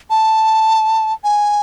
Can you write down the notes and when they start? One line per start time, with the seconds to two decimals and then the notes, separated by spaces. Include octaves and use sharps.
0.10 A5
1.24 G#5